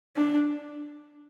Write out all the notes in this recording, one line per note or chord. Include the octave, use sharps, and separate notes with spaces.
D4